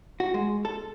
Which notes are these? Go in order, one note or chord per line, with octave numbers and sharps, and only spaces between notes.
F#4
G#3
A4